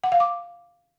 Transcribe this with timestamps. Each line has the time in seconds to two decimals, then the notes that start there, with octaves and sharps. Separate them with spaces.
0.04 F#5
0.12 F5
0.20 D6